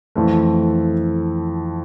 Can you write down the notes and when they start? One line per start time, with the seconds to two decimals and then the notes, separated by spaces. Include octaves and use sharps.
0.16 F2 E3 A3